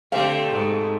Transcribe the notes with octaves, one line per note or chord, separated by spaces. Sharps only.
D3 A3 C4 G4 F5
G#2